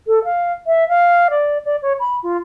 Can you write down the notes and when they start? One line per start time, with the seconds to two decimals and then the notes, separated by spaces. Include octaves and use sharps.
0.07 A4
0.24 F5
0.67 E5
0.89 F5
1.30 D5
1.65 D5
1.82 C#5
2.00 B5
2.23 F4